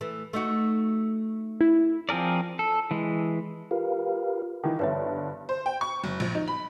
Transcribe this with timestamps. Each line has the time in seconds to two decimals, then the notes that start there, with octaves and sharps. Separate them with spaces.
0.01 E3 A3
0.33 A3 D#4 F#4
1.61 E4
2.09 F3 C4 G#4 A#4 D5
2.59 A4
2.91 E3 G#3
3.71 F4 G4 A#4 B4 F5
4.64 D#3 E3
4.79 G1 G2 B4 C#5 E5
5.49 C5
5.66 G5
5.81 C#6
6.04 F#1
6.20 A#1
6.35 D#4
6.48 B5